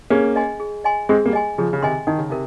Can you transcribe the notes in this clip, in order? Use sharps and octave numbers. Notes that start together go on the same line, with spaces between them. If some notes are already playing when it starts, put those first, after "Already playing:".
A#3 C#4 G#4
D#5 G#5 C6
G#4
D#5 G#5 C6
G#3 C4 G#4
G3 A#3
D#5 G#5 C6
C#3 F3 G#4
C#3
C3 D#3 D#5 G#5 C6
D#3 D#4
C#3
C3 A#4